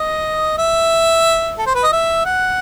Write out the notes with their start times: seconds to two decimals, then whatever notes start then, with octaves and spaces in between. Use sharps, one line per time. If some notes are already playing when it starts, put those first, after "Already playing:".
Already playing: D#5
0.58 E5
1.58 A4
1.66 C5
1.75 B4
1.83 D#5
1.92 E5
2.25 F#5